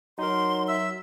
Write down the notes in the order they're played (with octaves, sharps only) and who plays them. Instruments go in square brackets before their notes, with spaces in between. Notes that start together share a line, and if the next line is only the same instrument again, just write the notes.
[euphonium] F#3 [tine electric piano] D#4 A#4 [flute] C6
[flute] E5 [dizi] E6